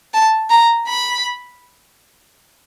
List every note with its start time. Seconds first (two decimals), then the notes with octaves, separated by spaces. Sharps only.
0.14 A5
0.50 A#5
0.88 B5